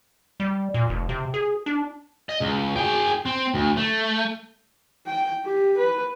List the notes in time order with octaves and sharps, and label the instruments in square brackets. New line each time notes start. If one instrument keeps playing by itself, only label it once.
[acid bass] G3
A#2
F1
C3
G#4
D4
[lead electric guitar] D#5
C#2
G#4 G5
C4
D2
A3
[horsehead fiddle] G5
G4
B4